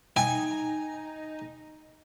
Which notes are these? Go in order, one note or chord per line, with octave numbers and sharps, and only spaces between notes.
D#4 G5 G#5